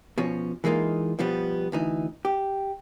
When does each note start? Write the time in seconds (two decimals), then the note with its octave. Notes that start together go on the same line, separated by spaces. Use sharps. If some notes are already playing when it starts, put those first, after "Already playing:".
0.18 B2 F3 C#4
0.64 E3 G#3 A#3 D#4 F4
1.19 B2 F3 G3 B3
1.72 D2 E3 D#4
2.25 G4